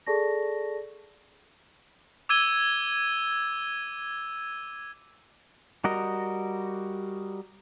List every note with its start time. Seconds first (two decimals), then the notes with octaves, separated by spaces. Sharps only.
0.06 G#4 A4 D5 A5 C#6 A#6
2.29 D6 E6 G#6 D#7 G7
5.84 G3 F#4 A#4 D#5